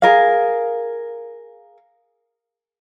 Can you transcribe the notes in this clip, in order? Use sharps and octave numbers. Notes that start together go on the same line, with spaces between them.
G#4 A#4 F5